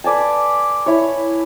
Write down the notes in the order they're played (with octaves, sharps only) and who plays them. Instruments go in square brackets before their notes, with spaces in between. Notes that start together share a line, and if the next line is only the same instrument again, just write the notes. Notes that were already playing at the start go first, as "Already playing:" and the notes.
[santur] B4 D5 G#5 A5
E4 C#5